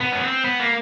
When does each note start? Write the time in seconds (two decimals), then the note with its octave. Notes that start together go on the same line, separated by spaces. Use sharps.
0.01 B3
0.12 C#4
0.23 C4
0.45 B3
0.60 A#3